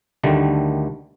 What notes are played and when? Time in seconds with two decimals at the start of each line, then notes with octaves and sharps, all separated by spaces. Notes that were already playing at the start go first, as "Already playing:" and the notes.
0.24 D2 D3 D#3 G3 A3